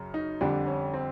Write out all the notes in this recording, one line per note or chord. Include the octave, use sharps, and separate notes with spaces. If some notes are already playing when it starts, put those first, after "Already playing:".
Already playing: F#2 C#3
D#4
F2 D3 G3 D4
C#4
C4